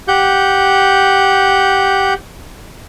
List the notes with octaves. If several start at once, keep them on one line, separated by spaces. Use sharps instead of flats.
G4 F#5 G6